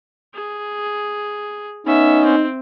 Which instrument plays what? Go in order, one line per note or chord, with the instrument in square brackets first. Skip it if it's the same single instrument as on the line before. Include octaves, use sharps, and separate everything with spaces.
[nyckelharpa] G#4
[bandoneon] B3 C#4 [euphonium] D#4 [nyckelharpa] E5
[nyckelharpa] C4